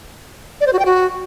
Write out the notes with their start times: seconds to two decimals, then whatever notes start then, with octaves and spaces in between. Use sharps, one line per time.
0.61 D5
0.67 C5
0.73 F#4
0.79 G5
0.85 F#4